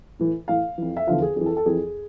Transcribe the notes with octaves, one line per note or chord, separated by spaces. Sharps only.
A2 E3
A2 E3 F5
F2 E3
E5
E2 D3 F3 F5
G#4
F2 E3 G#4
A4
A4
F2 E3 G#4